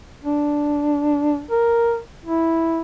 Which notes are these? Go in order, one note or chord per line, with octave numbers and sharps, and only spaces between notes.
D4
A#4
E4